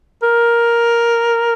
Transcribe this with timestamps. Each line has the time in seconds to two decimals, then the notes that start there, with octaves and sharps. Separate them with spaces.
0.23 A#4